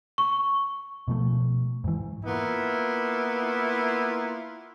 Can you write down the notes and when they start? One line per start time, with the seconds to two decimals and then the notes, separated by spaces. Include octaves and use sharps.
0.18 C#6
1.08 B2 F3 A3
1.84 G#2 E3
2.25 A#3 B3 E4 F4